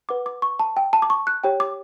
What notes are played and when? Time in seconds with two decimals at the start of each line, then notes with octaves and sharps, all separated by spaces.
0.09 B4 F#5 D6
0.26 D6
0.42 C#6
0.59 A5
0.77 G5
0.93 A5
1.02 D6
1.10 C#6
1.27 F#6
1.44 G4 C#5 G5
1.60 D6